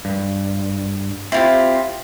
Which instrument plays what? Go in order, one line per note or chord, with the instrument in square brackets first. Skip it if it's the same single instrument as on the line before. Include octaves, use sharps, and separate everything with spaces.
[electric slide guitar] G2
[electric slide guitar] C4 [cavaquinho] E4 F4 G4